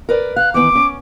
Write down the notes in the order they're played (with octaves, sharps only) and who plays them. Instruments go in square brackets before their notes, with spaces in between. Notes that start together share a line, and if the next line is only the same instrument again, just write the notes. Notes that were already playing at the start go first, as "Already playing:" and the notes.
[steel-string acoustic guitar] A#4 B4 D5
[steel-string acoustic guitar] F5 [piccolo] F#6
[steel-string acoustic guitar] D#3 E3 B3 [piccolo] D6
[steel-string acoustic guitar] C#4